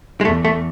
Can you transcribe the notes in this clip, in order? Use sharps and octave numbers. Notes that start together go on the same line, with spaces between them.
G#3
E2 A3
A3